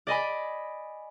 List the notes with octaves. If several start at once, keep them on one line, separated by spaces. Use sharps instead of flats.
D5 D#5 G#5 B5